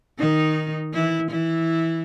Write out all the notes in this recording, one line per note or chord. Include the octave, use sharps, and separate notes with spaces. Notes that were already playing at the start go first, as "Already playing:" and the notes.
D#3 D#4
E3 E4
E3 E4